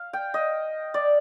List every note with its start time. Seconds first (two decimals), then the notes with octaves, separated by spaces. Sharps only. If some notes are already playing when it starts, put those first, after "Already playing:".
Already playing: F5
0.13 G5
0.34 D#5
0.94 D5